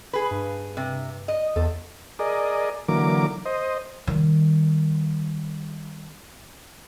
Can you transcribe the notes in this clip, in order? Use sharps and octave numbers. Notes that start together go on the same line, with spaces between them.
G#4 B4 B5
G2
C3
D#5
E2 A4
G#4 A#4 D5 D#5
D3 E3 F#3 A#3 A#4 D6
C5 D#5
D#3 G3